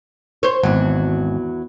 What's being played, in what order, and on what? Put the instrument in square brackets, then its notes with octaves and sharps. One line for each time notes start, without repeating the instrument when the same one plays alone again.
[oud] C5 C#5
[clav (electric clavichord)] G#1 [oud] E2 F#3